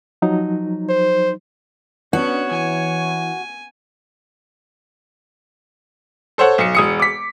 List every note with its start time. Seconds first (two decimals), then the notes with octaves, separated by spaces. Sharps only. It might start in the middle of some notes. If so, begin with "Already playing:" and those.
0.22 F3 F#3 D#4
0.89 C5
2.13 B3 C#4 D4 F#4 C#5
2.51 E3 G#5
6.38 A4 C5 C#5 F#5
6.58 B1 C#7
6.75 E1 D#6 C#7
7.00 D6 B6